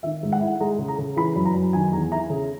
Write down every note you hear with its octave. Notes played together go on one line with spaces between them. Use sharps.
D#3 E5
G#2
F#5
E4
G#3 A#5
C#3
A#5
C#3
E3 B5
F#2
A#5
F#2
D#3 G#5
E2 A#5
E4 A#5
C#3